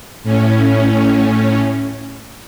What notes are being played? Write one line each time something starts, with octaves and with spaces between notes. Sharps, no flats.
A2 C#4